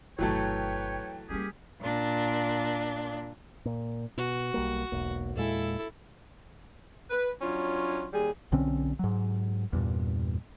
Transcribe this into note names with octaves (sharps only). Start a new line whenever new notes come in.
G1 B2 E3 F#3 A3 B4 C#5 G5
G3 A#3 C#4 G4 G#4
A#2 D4
A#2
B2 F#4
B1 G3 A#3
E1 B1 A#3
E2 A#2 G#3 E4 A4
B4
F#3 C#4 D4 F4
D#2 G3 G#4
B1 D3 C4 C#4
G#2 F#3
E2 G2 A#2